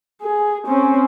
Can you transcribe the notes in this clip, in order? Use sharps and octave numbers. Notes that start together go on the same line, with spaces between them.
G#4
C4 C#4